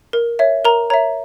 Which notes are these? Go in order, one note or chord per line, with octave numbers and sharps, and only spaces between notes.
A#4
C#5 E5
A#4 A#5
C#5 E5 A#5